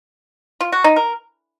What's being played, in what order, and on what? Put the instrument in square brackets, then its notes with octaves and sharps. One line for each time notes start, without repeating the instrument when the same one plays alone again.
[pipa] F4
F#4
D#4
A#4